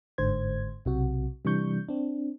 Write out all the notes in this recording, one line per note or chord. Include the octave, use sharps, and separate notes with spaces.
G1 G#2 D3 C5 G#6
B1 C3 F#4
C3 E3 G3 D4 C#6 G6
C4 D4